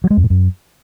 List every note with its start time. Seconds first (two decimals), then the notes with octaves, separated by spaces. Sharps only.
0.04 F#3
0.10 G#3
0.17 F2
0.24 A2
0.30 F#2